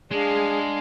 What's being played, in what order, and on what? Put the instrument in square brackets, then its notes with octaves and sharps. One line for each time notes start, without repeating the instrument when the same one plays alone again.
[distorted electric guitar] G#3 [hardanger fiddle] D4 F5 [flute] G#4